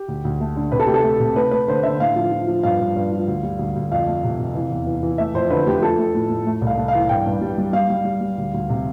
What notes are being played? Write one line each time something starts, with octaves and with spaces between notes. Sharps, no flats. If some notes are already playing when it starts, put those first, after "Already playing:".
Already playing: G4
D2
D2
A3
D3
C3 B4
A4
A3 G4
A4
A3
C3
A3 B4
A3 B4
D3 C5
D3 E5
A2 F5
F3
F3
F3
G2 F5
G2
G2
F3
D2
G3
D2
D2
F2 F5
A3
C3
C3
E3
E2
E3
E3
A3 E5
F2 C5
D3 B4
A3 G4
F3 A4
A3
A2
A2
A3
C2
F5
A3
F5
E3
G2 G5
G2
G3
G3
G3 F5
G3
G3
G3
D2
D2
C3